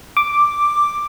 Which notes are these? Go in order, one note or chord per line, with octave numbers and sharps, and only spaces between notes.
D6